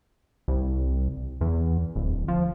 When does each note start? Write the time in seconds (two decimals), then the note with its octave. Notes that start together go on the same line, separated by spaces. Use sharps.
0.48 C2
1.41 E2
1.96 D1
2.28 F3